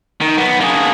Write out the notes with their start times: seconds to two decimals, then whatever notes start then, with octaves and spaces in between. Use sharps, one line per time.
0.21 D#3
0.37 B1 B3
0.61 A#3 G#4